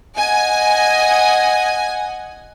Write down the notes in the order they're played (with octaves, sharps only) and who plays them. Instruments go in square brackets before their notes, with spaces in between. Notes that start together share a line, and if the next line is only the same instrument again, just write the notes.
[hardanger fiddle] D#5 F#5 [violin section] G#5